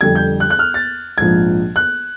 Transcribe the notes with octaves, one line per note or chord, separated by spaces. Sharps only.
F2 D3 G3 G#6
G6
F#6
F#6
F6
A6
A#1 G#2 F3 G#6
F#6